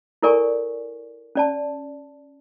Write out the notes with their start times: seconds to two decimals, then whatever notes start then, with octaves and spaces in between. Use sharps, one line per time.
0.22 E4 A4 A#4 D5 G#5 C#6
1.35 C#4 D5 A5